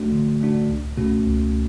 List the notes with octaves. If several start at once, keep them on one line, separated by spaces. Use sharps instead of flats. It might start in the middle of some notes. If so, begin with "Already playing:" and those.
Already playing: A3 D4 F#4
D3
A3 D4 F#4
C#2
B2 A3 C#4 F#4
C#2